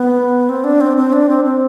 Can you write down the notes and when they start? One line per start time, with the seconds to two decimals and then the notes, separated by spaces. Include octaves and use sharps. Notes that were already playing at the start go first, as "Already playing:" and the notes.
Already playing: B3
0.49 C4
0.64 D4
0.81 C4
0.97 C4
1.13 D4
1.29 C4
1.45 C4